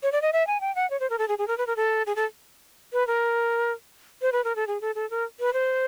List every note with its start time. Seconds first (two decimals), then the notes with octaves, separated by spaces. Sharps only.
0.03 C#5
0.12 D5
0.22 D#5
0.33 E5
0.47 G#5
0.61 G5
0.75 F#5
0.90 C#5
1.00 C5
1.10 A#4
1.19 A4
1.28 G#4
1.38 G#4
1.48 A#4
1.58 B4
1.67 A#4
1.77 A4
2.06 G#4
2.16 A4
2.93 B4
3.07 A#4
4.22 C5
4.32 B4
4.44 A#4
4.56 A4
4.67 G#4
4.81 A4
4.95 A4
5.10 A#4
5.40 B4
5.53 C5